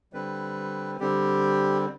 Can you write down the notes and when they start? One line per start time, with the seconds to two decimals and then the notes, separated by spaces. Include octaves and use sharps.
0.13 D3 G3 C4 B4
1.00 D3 G3 C4 G4